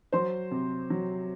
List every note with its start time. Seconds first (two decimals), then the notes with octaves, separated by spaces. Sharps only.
0.12 F#3 C5 C6
0.51 C3
0.90 F#3